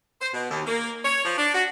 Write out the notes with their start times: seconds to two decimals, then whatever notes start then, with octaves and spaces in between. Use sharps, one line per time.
0.21 C5
0.34 B2
0.50 D#2
0.67 A#3
1.04 C#5
1.25 F3
1.38 D4
1.54 F#4